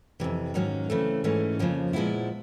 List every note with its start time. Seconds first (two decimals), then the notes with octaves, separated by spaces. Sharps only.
0.20 F2 C3 E3
0.54 G#2 D#3 F#3 A#3 C#4
0.90 C#3 E3 A3 C4
1.24 G#2 E3 A3 C#4
1.59 F2 C#3 F3 A#3
1.93 A#2 F3 G#3 B3 E4